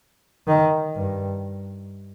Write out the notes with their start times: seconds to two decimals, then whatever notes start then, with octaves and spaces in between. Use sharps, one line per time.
0.47 D#3
0.95 G2